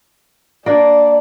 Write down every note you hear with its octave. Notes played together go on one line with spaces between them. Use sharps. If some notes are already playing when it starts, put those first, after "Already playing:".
A#3 D4 D5